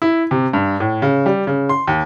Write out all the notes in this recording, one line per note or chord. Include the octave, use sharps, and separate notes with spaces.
E4
C3
G2
A2
C#3
G3
C#3
C6
D#2